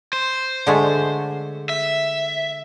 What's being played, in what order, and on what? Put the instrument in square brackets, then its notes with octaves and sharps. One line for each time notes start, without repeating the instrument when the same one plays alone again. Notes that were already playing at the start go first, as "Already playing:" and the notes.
[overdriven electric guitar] C5
[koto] D3 G#3 A3
[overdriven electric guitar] E5